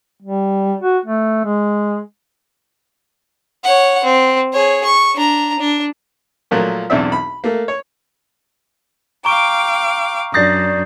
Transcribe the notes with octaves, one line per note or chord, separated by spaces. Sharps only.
G3
F#4
A3
G#3
C#5 F#5
C4
G#4 C#5
C#6
D4 A#5
D4
A#2 F3 F#3 A3 A#3
B1 E2 C4 D4 E5
B5
A3 A#3
C#5
F5 G5 A#5 C#6 D6 D7
F#2 D4 D#6 G6 A6 A#6 C7